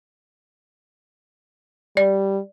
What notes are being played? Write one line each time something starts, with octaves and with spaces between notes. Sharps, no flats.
G3 D5